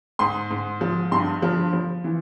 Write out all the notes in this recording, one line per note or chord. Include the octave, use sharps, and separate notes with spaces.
G#2 C6
G#2
F3
G2 C6
F3
F3
E3